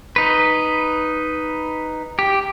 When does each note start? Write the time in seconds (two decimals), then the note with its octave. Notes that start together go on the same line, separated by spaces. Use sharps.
0.16 D#4 B4
2.19 G4